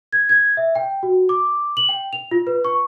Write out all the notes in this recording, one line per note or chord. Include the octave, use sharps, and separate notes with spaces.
G#6
G#6
E5
G5
F#4
D6
F#7
G5
F7
F4
B4
C#6